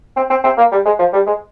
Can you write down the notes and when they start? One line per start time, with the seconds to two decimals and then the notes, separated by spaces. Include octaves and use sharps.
0.16 C4
0.30 C4
0.43 C4
0.57 A#3
0.72 G3
0.85 G#3
0.99 F3
1.13 G3
1.26 G#3